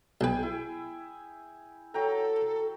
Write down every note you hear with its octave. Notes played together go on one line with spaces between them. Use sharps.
B1 G#4 B4 G5 G#5
E4
F#3 A4 G5 A#5